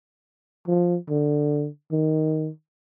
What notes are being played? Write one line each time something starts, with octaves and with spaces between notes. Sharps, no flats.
F3
D3
D#3